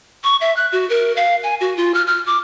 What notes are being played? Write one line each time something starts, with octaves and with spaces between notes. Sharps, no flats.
C#6
E5
F#6
F#4
A#4
F5
G#5
F#4
F4
F6
F6
D6